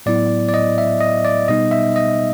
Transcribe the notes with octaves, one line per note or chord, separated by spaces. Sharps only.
A2 F#3 B3 E4 D5
D5
D#5
E5
D#5
D5
B2 G3 B3 D#4 D#5
E5
D#5